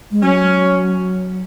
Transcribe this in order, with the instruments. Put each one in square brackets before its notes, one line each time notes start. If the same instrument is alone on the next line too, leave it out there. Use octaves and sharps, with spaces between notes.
[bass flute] G#3
[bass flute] F#3 [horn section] C#4